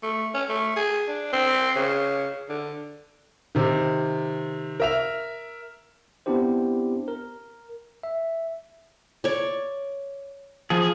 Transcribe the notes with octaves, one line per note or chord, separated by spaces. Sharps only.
A3
C#4
A3
G#4
D4
C4
C#3
D3
C3 D#3
A#4 E5 F7
B3 C4 D4 E4 G4 C5
A#4
E5
C#5 D5
F3 G#4